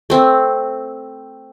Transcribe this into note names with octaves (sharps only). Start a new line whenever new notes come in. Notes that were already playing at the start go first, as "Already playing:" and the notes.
A3 C4